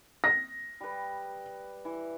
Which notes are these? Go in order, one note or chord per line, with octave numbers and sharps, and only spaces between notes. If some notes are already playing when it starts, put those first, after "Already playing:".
A#6
G3 B4
E3